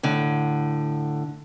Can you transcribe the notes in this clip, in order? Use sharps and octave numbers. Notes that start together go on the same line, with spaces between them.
A2 D3